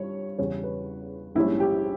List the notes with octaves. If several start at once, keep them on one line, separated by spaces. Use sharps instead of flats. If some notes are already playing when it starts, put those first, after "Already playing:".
Already playing: G2 C#5
E2 C#3 G3 C#4 C#5
B4
A#1 G#2 G3 C#4 E4
G4